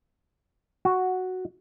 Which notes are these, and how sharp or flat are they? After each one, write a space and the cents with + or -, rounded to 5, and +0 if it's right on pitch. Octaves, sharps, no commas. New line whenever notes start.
F#4 +0